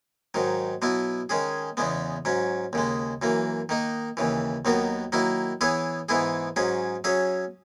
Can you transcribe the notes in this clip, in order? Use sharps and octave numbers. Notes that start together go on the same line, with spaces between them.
G#2 D#3 F#3
B2 F#3 B3 E4
D#3 G#3 C#4 G#4
E2 C#3 G#3 B3
G#2 F#3 C#4
D#2 C#3 G#3
F#2 E3 A#3
D#3 A#3 D#4
D#2 C#3 E3
D#2 D#3 F#3 B3 F#4
D#3 F#3 A#3 E4
E3 B3 E4 G#4 C#5
G#2 E3 B3 E4 G#4
G#2 F#3 C#4 G#4
F#3 C#4 G#4 C#5 E5